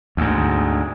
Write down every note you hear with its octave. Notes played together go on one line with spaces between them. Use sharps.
D2 G#2